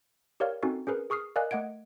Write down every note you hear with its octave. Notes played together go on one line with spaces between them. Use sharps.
G4 A#4 C#5 D5 F5 F6
C4 C#4 D#4 F#4 A4
C#4 G#4 A#4 B4
G#4 C#6 D#6 F6 C7
A#4 D5 D#5 F5 G#5 F#6
A3 D#5 F#5 G#6 D7